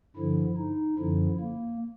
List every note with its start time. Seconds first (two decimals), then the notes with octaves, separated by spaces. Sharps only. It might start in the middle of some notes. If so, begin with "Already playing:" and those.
0.16 G2 D3 F3 E4
0.58 D#4
0.98 F#2 D3 F3 E4
1.40 A#3